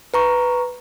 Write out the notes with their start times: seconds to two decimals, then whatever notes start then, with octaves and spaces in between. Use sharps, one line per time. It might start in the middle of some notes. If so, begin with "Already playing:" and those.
0.14 B4 A#5 C#6